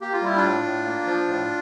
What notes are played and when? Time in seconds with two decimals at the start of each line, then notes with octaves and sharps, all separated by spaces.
0.01 A#3 G4
0.12 F4
0.21 G3 E4
0.36 D4 F4
0.43 A2
0.64 A2
0.85 A#3
1.06 F3
1.28 A2